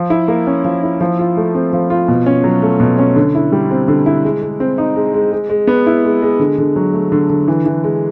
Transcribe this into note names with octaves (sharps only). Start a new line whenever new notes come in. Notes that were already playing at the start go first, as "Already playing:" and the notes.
Already playing: F3
E4
A#3
C#4
F3
E4
F3
F4
A3
C4
F3
F4
B2
C#4
F#3
A3
B2
C#4
D3
E4
G3
C4
D3
E4
G#3
G#3
C4
D#4
G#3
G#3
G#3
G#3
B3
E4
G#3
G#3
D3
D3
F#3
A3
D3
D3
E3
E3
G#3